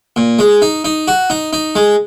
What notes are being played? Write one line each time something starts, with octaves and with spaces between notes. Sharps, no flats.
A#2
G#3
D#4
D#4
F#4
D#4
D#4
G#3